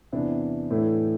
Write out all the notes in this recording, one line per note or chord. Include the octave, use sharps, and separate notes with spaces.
E2 C3 E3 D4
A2 E3 A3